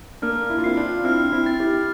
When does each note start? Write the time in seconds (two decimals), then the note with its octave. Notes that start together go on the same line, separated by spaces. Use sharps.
0.22 A#3 D4 F6
0.50 E4
0.58 F4
0.64 C4 E4 C7
0.77 D4 F4
1.04 C4 E4 F6
1.32 C4 E4
1.46 A6
1.60 E4 G4